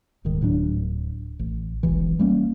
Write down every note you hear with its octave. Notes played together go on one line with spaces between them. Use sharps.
D#1 G#2 D#3
D1 A2 F#3 D4
A1
E1 B1 E3
G3 A#3 C#4